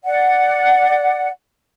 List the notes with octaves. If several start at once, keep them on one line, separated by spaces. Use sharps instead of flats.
D5 F#5